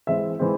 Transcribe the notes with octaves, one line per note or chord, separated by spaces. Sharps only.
E3 G#3 C4 E5
E3 G#3 C4